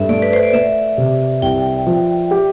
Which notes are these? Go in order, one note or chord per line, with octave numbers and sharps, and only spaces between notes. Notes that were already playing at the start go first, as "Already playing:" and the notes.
Already playing: G2 A4 E5
A3 D5
B4
C5
D5
A3 E5
C3
C2 G5
F3
G4